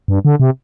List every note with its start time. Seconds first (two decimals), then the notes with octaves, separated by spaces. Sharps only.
0.08 G2
0.25 D3
0.40 C3